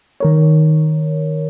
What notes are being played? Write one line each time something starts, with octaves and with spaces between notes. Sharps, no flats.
D#3 A#4 C#5